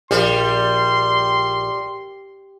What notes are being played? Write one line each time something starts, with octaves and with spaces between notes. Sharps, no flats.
A#1 G3 C6